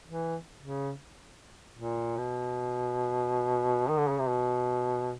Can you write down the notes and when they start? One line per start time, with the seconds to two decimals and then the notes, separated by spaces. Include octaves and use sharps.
0.06 E3
0.62 C#3
1.75 A#2
2.17 B2
3.89 D#3
3.98 D3
4.09 C#3
4.18 C3
4.28 B2